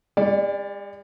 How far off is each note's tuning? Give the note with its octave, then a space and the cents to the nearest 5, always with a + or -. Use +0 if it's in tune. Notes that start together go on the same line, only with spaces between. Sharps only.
G#3 -45 D5 +0